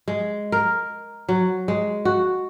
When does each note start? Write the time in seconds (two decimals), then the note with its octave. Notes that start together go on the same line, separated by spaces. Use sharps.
0.08 G#3
0.52 A#4
1.29 F#3
1.68 G#3
2.05 F#4